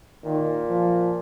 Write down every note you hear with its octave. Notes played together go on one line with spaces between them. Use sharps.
A#2 D#3
F3